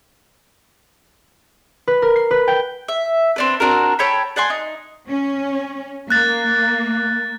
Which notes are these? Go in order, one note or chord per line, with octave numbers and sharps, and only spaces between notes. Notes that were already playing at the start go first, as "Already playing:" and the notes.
B4
A#4
C7
B4
G5
E5
C4 D4 B4
C4 D4 F#4 A#4
A4 C#5 G5 B5
D5 F#5 G#5 C6
D#4
C#4
A#3 F#6 A6